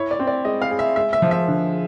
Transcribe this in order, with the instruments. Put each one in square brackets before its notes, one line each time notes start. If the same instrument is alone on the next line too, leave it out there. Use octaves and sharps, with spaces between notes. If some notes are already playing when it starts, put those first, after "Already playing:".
Already playing: [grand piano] E4 [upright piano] C#5
[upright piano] D5
[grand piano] C4
[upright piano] D5
[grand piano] G#3 [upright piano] D#5
[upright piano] F5
[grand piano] G#4
[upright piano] E5
[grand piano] G#3 [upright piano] E5
[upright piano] E5
[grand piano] F3
[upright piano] E5
[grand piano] D3